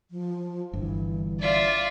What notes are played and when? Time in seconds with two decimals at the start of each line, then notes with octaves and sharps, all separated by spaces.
0.11 F3
0.73 G1 G2 E3
1.41 F4 D5 E5